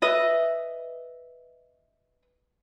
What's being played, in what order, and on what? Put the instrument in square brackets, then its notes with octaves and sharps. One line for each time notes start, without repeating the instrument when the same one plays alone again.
[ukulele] B4 D#5 E5